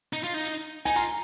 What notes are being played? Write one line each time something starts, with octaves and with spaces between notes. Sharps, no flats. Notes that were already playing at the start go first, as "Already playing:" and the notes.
D#4
F4
D#4
D#4 G#5
F4 A#5